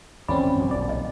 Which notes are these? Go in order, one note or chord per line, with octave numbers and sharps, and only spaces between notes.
G#1 E2 C#3 C4 C#4 D5 B5
F#2 B2 F3
D#1 B1 D5
D#5